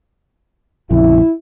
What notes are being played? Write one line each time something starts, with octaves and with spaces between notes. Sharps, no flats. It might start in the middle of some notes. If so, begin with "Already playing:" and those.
A#1 F2 C#3 E4